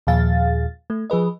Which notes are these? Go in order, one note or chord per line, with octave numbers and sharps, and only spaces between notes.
D#2 A#2 F3 G#4 F5 A6
A3
F3 G#4 B4 D#5